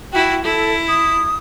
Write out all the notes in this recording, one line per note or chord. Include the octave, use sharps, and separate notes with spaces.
E4 F#4 G5
E4 A4
D#6